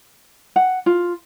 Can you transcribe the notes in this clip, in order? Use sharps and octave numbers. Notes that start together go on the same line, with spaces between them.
F#5
F4